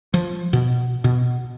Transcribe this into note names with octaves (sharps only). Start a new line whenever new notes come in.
F3
B2
B2